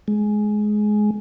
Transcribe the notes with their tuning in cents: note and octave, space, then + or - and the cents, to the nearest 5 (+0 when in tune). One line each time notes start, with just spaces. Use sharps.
G#3 +15